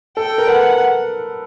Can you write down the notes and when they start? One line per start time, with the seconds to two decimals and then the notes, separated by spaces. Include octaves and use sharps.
0.17 A4 G5
0.38 A#4
0.47 B4 F#5